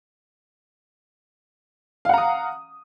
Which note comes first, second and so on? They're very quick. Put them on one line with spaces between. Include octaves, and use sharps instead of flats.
F5 F#5 A#5 D#6